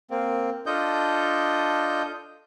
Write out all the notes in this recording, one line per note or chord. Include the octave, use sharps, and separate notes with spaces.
A#3 C4
D4 F4 A4 D#5 G6